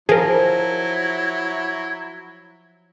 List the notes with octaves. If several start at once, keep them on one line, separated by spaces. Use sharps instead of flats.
F3 F#3 E4 G#4 A#4